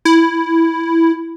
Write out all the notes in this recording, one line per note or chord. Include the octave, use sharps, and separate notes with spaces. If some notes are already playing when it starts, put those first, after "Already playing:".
E4